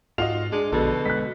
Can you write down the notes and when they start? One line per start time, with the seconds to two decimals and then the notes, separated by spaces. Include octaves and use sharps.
0.18 G#2 F4 F#4 D#5 F7
0.52 G#3 D4
0.72 A#1 B2 D3 A4
1.06 G#3 F#6 B6